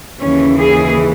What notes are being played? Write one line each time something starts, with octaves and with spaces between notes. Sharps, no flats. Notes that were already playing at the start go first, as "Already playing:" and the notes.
D#2 C#3 E3 C#4
G#4